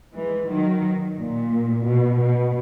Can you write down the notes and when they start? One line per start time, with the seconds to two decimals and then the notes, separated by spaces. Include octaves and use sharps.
0.14 E3 G#3
0.48 D#3 F#3
1.17 A#2
1.85 B2
2.19 B2